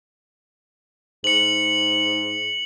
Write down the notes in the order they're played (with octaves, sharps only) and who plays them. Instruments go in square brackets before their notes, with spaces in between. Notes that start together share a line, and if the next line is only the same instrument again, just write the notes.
[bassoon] G#2 [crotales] C#7 F#7